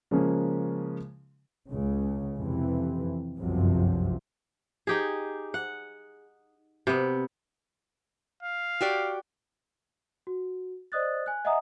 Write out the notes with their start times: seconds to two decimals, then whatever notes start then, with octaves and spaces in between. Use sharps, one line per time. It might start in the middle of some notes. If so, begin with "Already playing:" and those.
0.11 C#3 F3 G#3 A#3 C#4
1.69 C#2 C#3
2.38 F2 C3 E3
3.40 G1 C2 F#2 C3 F3 F#3
4.87 D#4 G4 G#4
5.54 F#5
6.87 C3 B3
8.43 F5
8.81 F#4 G4 D5
10.27 F#4
10.92 C5 D5 D#5 D#6 F#6 A6
11.26 G#5 F#6
11.45 D#5 E5 F#5 G#5 A#5 D#6